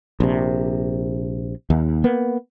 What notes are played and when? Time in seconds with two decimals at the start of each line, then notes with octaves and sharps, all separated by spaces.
0.20 A#1 C3
1.70 D#2
2.04 A#3 B3